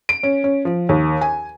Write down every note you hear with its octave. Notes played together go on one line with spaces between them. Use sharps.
D7
C#4
C#4
F3
D#2
G#5